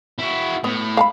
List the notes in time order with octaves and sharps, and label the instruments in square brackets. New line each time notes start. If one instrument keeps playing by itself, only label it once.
[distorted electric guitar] E4 F#4
[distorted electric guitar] A2 [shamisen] B3
[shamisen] F5 A5 B5